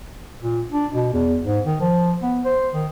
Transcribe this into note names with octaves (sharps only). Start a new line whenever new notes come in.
A#2
D4
B2
E2
G#2
D#3
F3
B3
C5
D#3